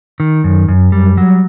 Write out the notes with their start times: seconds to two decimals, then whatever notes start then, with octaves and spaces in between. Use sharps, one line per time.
0.20 D#3
0.44 F#2
0.68 F#2
0.92 G3
1.17 F#3